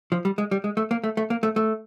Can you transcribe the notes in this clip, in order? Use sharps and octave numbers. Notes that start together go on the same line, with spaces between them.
F3
G3
G#3
G3
G#3
A3
A#3
A3
A3
A#3
A3
A3